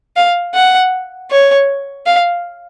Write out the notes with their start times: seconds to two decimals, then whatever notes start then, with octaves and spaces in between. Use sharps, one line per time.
0.16 F5
0.54 F#5
1.31 C#5
2.07 F5